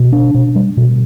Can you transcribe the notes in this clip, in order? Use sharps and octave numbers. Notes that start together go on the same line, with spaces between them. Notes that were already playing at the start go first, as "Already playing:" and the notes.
Already playing: B2
D4
B2
G3
B2